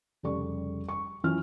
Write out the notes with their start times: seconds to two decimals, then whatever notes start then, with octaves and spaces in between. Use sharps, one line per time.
0.23 F1 C#3 G3 A4 D5 C#6
0.89 C#6
1.24 F#2 E3 C#4 F4 F6